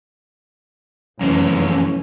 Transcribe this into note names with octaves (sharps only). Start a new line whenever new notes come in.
F1 F#2 E3 C#4